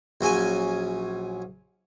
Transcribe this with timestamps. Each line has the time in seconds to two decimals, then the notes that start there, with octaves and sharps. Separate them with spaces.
0.21 A#1 F#3 C#4 G#5